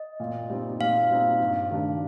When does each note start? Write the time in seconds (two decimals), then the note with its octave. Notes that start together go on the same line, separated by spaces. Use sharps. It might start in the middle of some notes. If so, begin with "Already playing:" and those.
Already playing: D#5
0.20 A#2
0.50 G3 C4 D#4
0.80 A#2 F5
1.10 G3 C4 D#4
1.41 G2
1.71 D#3 G3 D4